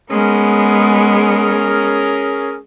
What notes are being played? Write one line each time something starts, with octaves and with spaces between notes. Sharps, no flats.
G#3 B3 C#4 G#4 A#4